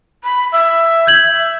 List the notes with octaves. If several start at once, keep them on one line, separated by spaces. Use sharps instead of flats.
B5
E5
G6 G#6 F#7
E5